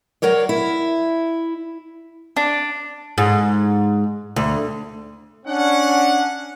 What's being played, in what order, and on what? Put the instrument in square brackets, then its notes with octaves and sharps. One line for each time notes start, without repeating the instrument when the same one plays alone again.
[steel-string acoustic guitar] F#3 A#4 C#5 D5
E4
[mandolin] D4
[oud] G#2
D2
[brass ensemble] C#4 D4 F#5